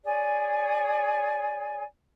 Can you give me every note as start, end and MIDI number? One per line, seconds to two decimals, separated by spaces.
0.04 1.82 68
0.04 1.82 73
0.04 1.82 74
0.04 1.82 80